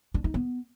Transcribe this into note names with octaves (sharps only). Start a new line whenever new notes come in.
D4
D#4
B3